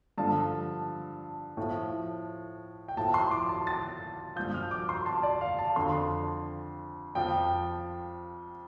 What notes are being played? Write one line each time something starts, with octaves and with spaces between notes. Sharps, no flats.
G2 D3 F3 A5
A2 F3
G5
A2 F3 A5
C6
D6
A5
A6
G2 F3 G6
F6
D6
C6
A5
D5
F5
A5
F2 D3 F3 C6
F2 F3 G5